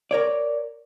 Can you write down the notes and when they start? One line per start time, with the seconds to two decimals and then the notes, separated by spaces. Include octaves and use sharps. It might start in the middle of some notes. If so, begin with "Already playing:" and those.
0.11 A#4 C#5 D5